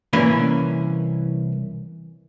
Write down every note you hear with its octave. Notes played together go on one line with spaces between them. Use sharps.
C2 E3 A#3 C#4 B4